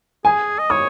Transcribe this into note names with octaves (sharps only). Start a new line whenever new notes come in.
G#4 G#5
D#5
C#5 D#6